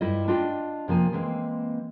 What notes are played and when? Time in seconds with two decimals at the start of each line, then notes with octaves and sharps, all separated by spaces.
0.01 G2 G3 E4 F4 A4 D#5
0.28 D4 F4 D5 D#5 G5
0.88 C3 F3 A#3 G#5
1.13 E3 G#3 A#3 C4